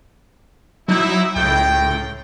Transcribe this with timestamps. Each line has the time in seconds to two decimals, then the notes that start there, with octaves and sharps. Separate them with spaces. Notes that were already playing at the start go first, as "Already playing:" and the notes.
0.88 F#3 D#4 E4
1.36 C#2 A2 G5